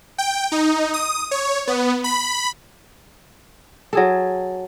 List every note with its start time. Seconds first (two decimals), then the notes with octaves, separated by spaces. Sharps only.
0.18 G5
0.52 D#4
0.94 D#6
1.31 C#5
1.67 B3
2.04 B5
3.93 F#3 G#4 A4